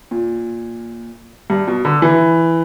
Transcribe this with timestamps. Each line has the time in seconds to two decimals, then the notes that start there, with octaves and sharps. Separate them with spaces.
0.11 A#2
1.50 G2
1.67 B2
1.85 D3
2.02 E3